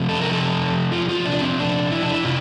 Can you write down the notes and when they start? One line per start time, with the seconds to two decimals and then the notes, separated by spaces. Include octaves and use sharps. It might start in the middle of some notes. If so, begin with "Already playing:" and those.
Already playing: C3 F3 A3 C4
0.09 A4
0.21 A#4
0.33 A4
0.92 F4
1.09 F4
1.25 D4
1.41 C4
1.59 D4
1.92 E4
2.03 D4
2.13 E4
2.25 C3 F4